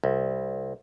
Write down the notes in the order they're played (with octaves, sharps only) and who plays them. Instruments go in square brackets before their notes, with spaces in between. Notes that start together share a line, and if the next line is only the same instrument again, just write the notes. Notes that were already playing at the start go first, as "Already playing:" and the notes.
[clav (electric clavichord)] C2